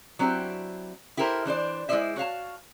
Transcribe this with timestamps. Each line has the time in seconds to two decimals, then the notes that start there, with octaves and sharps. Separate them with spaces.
0.19 F#3 C4 D4 E4 G4
1.17 E4 G4 A4 A#4 C5
1.45 E3 D4 C5 D5
1.89 G#3 E4 F4 C5 D5 E5
2.16 F#4 C#5 F5 A5